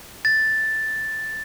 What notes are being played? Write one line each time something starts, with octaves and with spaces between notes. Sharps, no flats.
A6